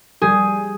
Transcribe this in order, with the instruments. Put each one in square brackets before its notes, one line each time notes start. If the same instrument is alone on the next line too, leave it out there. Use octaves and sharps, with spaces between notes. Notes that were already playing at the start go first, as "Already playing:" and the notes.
[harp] G3 G#4